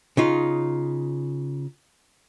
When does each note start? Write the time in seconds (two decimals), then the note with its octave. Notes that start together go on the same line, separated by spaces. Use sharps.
0.17 C#3 D#4 F4